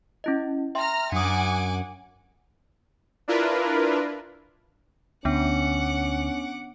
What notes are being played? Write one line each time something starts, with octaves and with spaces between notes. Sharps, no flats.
C#4 E4 D#5
E5 G5 A#5 C6 F6
F#2 D4 F#5 G#5 D6 D#6
D4 E4 F4 A#4 B4
D2 B3 C#4 D4 F#5 D6